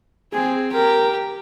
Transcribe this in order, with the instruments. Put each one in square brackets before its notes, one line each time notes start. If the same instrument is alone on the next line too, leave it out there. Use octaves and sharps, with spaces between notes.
[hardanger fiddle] C4 [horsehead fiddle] G#4
[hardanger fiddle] G4 [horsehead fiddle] A#4